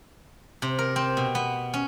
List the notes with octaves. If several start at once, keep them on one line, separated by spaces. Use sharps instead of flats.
C3
A#4
C4
B2
B3
C#4